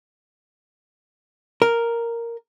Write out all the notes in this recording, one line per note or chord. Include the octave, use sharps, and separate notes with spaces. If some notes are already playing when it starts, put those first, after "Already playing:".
A#4